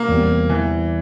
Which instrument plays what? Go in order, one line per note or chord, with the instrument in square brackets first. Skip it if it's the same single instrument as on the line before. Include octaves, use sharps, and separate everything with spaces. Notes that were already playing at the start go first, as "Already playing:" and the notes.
Already playing: [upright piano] A#3
[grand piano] E2 C3 G3 C4
[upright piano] E3